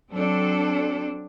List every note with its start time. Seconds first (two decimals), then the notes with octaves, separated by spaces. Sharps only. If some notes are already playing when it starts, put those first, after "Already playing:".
0.12 F#3 C4 D4 A4